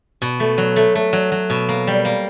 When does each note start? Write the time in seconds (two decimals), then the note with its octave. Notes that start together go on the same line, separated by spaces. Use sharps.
0.22 B2
0.40 A3
0.58 F#3
0.76 A3
0.95 A3
1.13 F#3
1.32 F#3
1.50 B2
1.69 A#3
1.87 G3
2.05 A#3